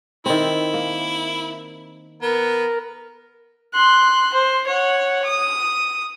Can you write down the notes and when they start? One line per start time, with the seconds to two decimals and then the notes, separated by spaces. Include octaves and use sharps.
0.26 D#3 C4 E4
0.74 A#3
2.22 B3 A#4
3.74 C6 F#6
4.34 C5
4.67 C#5 F#5
5.24 D#6